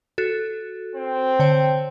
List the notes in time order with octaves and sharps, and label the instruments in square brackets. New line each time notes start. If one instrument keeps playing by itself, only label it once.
[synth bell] F#4 A4
[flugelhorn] C4
[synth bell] D3 C#5 G5